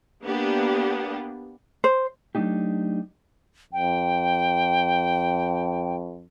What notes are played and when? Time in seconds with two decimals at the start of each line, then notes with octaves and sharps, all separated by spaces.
0.24 A#3 B3 D4 G4
1.84 C5
2.35 F#3 A3 D4 D#4 G4
3.73 F2 G5